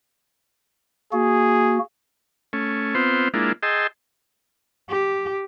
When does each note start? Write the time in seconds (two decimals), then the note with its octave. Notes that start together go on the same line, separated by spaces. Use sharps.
1.13 A#3 F#4 G#4
2.53 A3 C#4
2.95 B3 C4 F4 C5
3.34 G#3 A#3 D4 E4 F4
3.63 G#4 D#5 G5 A5 C6 E6
4.90 G4